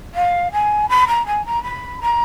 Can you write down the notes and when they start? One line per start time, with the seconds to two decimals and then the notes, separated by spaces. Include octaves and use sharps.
0.15 F5
0.52 G#5
0.89 B5
1.08 A#5
1.26 G#5
1.45 A#5
1.63 B5
2.01 A#5